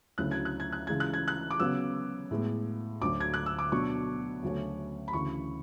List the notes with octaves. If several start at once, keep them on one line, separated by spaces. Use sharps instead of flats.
D2 C#3 F#3 A3 E4 F#6
G#6
F#6
G#6
F#6
C#3 E3 G#3 G#6
F#6
G#6
F#6
D6
C#3 F#3 B3 E6
A2 G#3 B3
D2 D3 F#3 D6
G#6
F#6
E6
D6
B2 F#3 B3 D4 C#6
D2 C#3 F#3 A3 C#4
B5
D2 C#3 E3 C#6